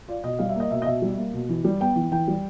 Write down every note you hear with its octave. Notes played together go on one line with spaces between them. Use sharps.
F4 D5
B2 D#5
G3 F5
E5
A#3 D#5
B2 E5
D#5
B2 E5
G3
A#3
B2
E3
G3
B3 G5
E3
E3 G5
G3